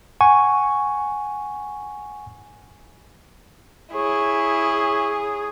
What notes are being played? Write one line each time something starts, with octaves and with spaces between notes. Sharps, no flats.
F#5 G#5 C#6
E4 G#4 C#5